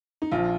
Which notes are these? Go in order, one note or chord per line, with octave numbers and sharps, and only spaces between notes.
D#4
A#1 F3 F4